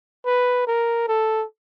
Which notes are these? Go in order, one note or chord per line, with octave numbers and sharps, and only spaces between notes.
B4
A#4
A4